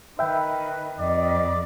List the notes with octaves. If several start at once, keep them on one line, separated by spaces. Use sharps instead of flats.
D#3 B4 E5 G5
F2 D5 D#5